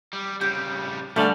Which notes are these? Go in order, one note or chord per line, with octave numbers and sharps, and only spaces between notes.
G3
C#3 G3 G4
D3 G3 A3 F4 G#5